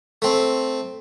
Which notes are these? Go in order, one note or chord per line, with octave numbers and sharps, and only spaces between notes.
A3 C4